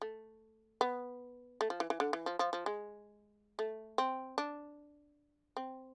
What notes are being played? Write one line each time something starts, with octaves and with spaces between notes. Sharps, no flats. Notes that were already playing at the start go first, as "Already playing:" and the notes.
A3
B3
A3
F3
E3
E3
D3
E3
F3
F3
F3
G#3
A3
C4
D4
C4